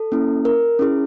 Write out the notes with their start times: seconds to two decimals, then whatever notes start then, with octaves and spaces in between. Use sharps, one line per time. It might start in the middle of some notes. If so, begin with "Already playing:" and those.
Already playing: A4
0.12 A#3 C#4 E4
0.45 A#4
0.79 C#4 E4 G#4